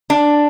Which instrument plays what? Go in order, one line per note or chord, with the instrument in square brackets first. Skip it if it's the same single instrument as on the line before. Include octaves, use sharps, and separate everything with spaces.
[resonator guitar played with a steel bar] D4